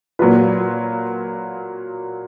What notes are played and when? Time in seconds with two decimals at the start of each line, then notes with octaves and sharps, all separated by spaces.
0.19 A#2 F#3 A#3 F4 B4